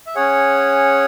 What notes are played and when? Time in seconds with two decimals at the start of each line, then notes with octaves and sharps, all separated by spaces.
0.07 E5
0.15 C#4 G#4 C#5 F#5